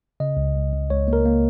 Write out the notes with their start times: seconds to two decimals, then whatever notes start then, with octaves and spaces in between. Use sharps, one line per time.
0.20 C#3 D#5
0.37 C#2
0.55 C#2
0.72 C#2
0.90 C#2 C#5
1.08 A#3
1.13 A#4
1.25 A#3